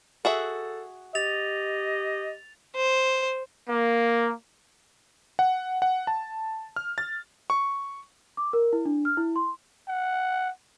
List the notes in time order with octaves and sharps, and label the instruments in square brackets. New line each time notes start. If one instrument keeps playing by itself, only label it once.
[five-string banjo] F#4 G#4 E5 [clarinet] A4
[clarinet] G4 [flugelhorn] D#5 [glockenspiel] A6 F7
[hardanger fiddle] C5
[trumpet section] A#3
[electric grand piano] F#5
F#5
A5
F6
A6
C#6
[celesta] D6
A#4
E4
D4
F6
E4
C6
[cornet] F#5